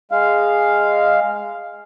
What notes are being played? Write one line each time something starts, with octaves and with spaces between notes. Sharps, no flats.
G#3 F5